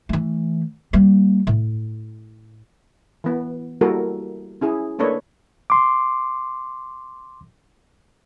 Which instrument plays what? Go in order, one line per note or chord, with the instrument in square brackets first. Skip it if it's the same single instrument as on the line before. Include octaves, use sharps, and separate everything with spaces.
[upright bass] E3 A3
G3 A#3
A2
[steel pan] E3 B3
G3 A#3 E4 F#4 A4 A#4
C#4 E4 G#4
A3 A#3 D4 A4 B4 C#5
[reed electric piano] C6 D6